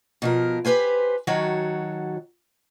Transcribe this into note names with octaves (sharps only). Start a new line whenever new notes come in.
B2 F3 A#4
G4 B4 C5 G#5
D#3 F#3 F#4 A4 C#5